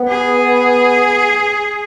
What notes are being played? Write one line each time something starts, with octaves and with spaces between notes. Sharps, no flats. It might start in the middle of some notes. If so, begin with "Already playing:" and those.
Already playing: B3
G#4